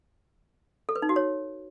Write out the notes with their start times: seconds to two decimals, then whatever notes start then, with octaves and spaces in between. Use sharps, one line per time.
0.89 A4
0.96 B4
1.02 D#4
1.09 F#4
1.16 C#5